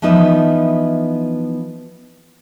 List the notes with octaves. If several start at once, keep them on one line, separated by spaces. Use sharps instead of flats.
E3 F3 B3 D#4 B4 E5